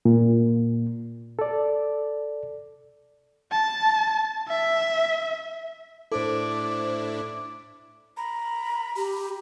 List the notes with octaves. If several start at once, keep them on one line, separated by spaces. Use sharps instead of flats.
A#2
A4 D5
A5
E5
A2 D4 E4 A4 C5 D6
A#5 B5
G4